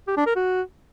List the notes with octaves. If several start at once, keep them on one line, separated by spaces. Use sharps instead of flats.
G4
D4
A#4
F#4